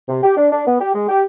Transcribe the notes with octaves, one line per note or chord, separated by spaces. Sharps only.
C3
G4
D4
D4
B3
G4
G#3
G4